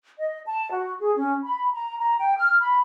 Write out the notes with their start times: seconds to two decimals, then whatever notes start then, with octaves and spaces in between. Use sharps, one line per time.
0.18 D#5
0.46 A5
0.70 F#4
0.99 G#4
1.15 C#4
1.43 B5
1.74 A#5
1.99 A#5
2.19 G5
2.38 F6
2.60 B5